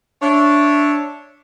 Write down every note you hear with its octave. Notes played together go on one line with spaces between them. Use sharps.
D4 C#5 E5